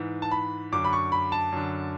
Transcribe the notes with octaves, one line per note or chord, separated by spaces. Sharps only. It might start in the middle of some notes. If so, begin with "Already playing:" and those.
Already playing: G#2 E3
A5
B5
F#2 D3 D6
B5
C#6
B5
A5
F#2 D3